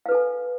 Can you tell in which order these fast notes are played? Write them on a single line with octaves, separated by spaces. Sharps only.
F5 B4 A4 G#5